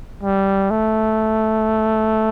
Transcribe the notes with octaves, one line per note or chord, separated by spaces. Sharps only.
G3
A3